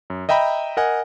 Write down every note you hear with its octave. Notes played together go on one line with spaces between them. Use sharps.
F#2
D#5 E5 G5 A#5 B5
A#4 D#5 F#5 G#5